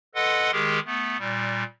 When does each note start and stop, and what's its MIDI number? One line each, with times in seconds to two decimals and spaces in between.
0.15 0.51 69
0.15 0.51 71
0.15 0.51 75
0.15 0.51 78
0.15 0.51 84
0.52 0.80 51
0.52 0.80 56
0.52 0.80 67
0.52 0.80 68
0.52 0.80 70
0.86 1.17 57
0.86 1.17 59
1.19 1.64 46
1.19 1.64 55